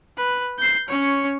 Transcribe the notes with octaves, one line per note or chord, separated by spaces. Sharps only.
B4
G6 C7
C#4 C#5